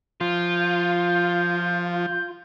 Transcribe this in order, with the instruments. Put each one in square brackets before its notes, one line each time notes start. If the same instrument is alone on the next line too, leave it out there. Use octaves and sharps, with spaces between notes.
[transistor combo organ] F3 [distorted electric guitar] F4 [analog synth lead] G6